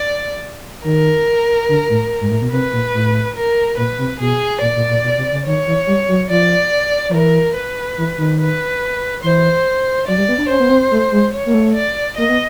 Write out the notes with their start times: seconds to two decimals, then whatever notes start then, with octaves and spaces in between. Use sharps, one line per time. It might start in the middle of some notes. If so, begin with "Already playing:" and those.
Already playing: D5
0.84 D#3 A#4
1.69 D3
1.89 A2
2.21 G#2
2.30 A2
2.42 B2
2.52 C3 B4
2.73 A#2
2.94 A2
3.36 A#4
3.77 A#2 B4
3.98 C3
4.20 B2 G#4
4.61 A#2 D5
4.76 A#2
4.89 A#2
5.04 B2
5.18 C3
5.32 C#3
5.46 D#3 C#5
5.67 E3
5.87 G3
6.08 F#3
6.30 F3 D5
7.09 F3
7.14 E3 A#4
7.55 B4
7.98 E3
8.18 D#3
8.40 B4
9.23 E3 C5
10.07 F#3 D5
10.18 G3
10.29 B3
10.38 D4
10.49 C#4 C5
10.60 B3
10.70 C4
10.91 A3
11.12 G#3
11.33 C#5
11.46 A#3
11.54 A3
11.75 D5
12.17 A#3 D#5
12.29 B3